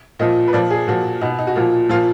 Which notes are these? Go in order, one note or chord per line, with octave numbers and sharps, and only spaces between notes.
A#2 F3 D#5
B4
A#2 F3 D5
G#4
A#2 F3 F#4
B2 D#4
D#4
F#4
A#2 F3
A#2 F3 F4